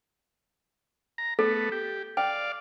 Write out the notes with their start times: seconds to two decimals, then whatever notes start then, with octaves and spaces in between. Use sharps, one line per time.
1.18 A#5
1.39 A3 B3 A4
1.72 G4
2.17 D5 F5 G5